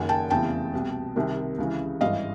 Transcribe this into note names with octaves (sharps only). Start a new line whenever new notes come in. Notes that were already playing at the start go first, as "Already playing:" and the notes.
Already playing: F#1 F#2 D#3 F#5 G#5
G5 A5
F1 E2 C#3 E3 G5 A5
C2 B2
C2 C3 D#3
C#2 C#3 E3
G#1 G2 E3 D#5 F5